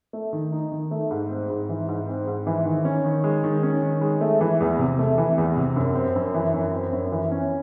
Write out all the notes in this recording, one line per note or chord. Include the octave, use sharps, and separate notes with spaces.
A3
D#3
D#4
D#3
A3
G#2
C4
G#2
E3
G#2
C4
G#2
E3
D#3
C#4
D#3
G#3
D#3
C#4
D#3
G#3
A3
E3
E2
C3
A3
E3
E2
C3
F#2
C4
F#2
E3
F#2
C4
F#2
E3
C#4